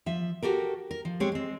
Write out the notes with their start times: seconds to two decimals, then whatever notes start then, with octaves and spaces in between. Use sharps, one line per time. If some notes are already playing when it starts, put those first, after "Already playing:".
0.06 F3 E5
0.43 F#4 G4 A4 A#4
0.91 A#4
1.05 F3
1.20 G#3 C4 G4 C#5
1.32 G#3 C4